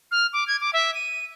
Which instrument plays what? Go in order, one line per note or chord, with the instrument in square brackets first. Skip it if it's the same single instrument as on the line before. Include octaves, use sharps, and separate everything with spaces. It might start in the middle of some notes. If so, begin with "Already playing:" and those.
[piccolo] F6
D6
G#6
D6
E5
D#7